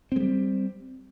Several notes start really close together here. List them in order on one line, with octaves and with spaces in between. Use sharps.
C4 G#3 G3